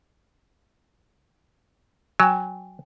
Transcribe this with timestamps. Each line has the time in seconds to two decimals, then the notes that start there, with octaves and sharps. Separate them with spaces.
2.20 F#3 G5 G#5